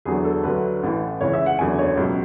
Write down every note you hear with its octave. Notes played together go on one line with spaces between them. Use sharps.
E2 D3 F#3 G#4
A4
D2 D3 F#3 B4
A1 A2 E3
C#2 C#3 E3 C#5
E5
F#5
F#1 E2 D3 F#3 G#5
C#5
C#2 B2 F#3